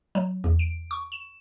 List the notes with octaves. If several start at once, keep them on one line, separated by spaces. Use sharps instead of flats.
F#3
E2
D7
C#6
E7